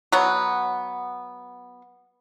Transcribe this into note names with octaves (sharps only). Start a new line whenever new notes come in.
F#3 B3